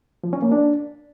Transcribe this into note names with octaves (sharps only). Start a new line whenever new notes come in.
F3
C#4
A#3
D4